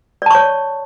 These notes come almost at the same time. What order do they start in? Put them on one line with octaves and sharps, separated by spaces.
D5 A5 C#6 C#5